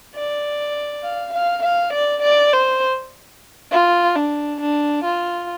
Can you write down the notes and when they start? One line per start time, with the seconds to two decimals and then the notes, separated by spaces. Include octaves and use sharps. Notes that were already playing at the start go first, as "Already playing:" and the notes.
0.15 D5
1.03 F5
1.33 F5
1.63 F5
1.93 D5
2.22 D5
2.53 C5
3.71 F4
4.15 D4
4.60 D4
5.04 F4